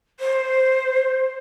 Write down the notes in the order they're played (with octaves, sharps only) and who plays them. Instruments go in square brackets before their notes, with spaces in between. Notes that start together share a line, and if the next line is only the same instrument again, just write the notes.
[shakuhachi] C5